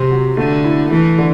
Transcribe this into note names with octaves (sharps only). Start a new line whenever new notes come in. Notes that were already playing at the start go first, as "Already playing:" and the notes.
Already playing: C3 C4
F#3
D3 A3
E4
E3 A3
D3